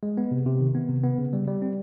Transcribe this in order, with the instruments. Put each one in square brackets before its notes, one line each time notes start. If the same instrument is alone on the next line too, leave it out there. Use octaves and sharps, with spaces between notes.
[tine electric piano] G#3
B3
C3
C3
D#3
B3
C3
B3
C#3
G3
G3
C4